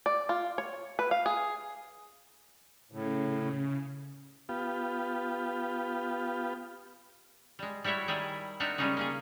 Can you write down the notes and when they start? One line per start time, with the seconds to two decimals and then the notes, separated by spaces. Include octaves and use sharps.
0.06 D5
0.29 F4
0.58 C#5
0.99 B4
1.11 F5
1.26 G#4
2.92 A2 C#3
4.49 B3 F4 G4
7.59 G3 G#3
7.84 G3 E4 F#4 C#5 E5
8.08 D#3 G3 E4 G#4
8.60 C4 D4 D#4 A#4 E5 F#5
8.78 C#3 G3 G#3 C#4 D#4 G#4
8.97 A#3 C#4 G#4